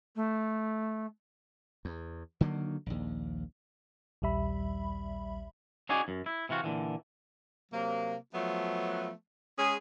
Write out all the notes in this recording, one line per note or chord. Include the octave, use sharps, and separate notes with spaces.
A3
E2
D3 D#3 F#3 A#3
A#1 D#2
A#1 D#2 G3 E5 B5
C#4 D#4 F#4 G#4 D5 G#5
F#2
E4
C3 E3 F4 F#4
A#2 D3 E3
C3 F#3 A#3
F3 F#3 A3 B3
G#3 C#4 G#4